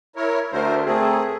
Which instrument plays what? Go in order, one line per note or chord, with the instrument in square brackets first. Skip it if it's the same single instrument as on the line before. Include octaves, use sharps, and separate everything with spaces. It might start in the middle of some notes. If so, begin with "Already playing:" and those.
[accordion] E4 A#4 C#5
[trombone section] D2 A3 [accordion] A#4 C5
[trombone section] A3 C4 A#4 [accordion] G#4